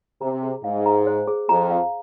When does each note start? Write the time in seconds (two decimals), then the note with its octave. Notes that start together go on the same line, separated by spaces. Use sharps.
0.21 C3 A#5
0.43 G#4
0.63 G#2 F5
0.86 A#5
1.07 C5
1.27 G#4
1.49 F2 A#5
1.70 F5